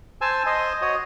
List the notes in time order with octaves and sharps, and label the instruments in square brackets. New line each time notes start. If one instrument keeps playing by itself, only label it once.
[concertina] C5 G#5 A5 E6
C5 D#5 C6
F#4 C#5 D#5